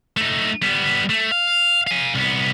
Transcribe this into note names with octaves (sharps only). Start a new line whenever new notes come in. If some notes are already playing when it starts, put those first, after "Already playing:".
A3 D#4
G3 B3
A3
F5
F5 G#5
C2 B3